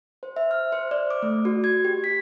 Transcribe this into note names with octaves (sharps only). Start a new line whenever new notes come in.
C5
E5
F6
C5
D5
D6
A3
F#4
G#6
G4
B6